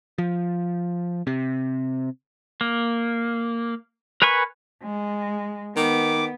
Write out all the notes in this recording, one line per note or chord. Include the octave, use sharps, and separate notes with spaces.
F3
C3
A#3
A#4 B4 G#5 B5 C#6
G#3
D#3 B3 D6